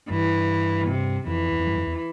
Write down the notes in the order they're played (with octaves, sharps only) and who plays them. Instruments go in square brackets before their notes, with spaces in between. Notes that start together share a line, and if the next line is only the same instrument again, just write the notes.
[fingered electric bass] G2 [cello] E3
[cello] C3
[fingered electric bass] F2 [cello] E3
[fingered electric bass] E2
F2
G2
F2
E2